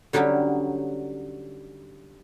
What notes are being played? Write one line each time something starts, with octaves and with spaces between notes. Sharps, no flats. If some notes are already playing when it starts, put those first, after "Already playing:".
D3 F#3 G3 C#4 D#4